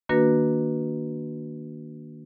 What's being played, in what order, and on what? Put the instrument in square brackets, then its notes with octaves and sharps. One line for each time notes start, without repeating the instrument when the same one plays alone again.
[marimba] D#3 A#3 D4 F#4 B4 A#6